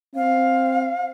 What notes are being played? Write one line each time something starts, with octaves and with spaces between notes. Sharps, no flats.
C4 F5